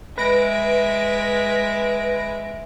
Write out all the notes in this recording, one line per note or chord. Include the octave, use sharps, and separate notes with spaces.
G#3 B4 E5 A#6 D7